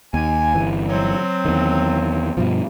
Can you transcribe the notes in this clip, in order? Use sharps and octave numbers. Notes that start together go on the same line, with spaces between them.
D#2 G#5
G1 E3
F#3 C4
E2 D#3
G2 B2 F3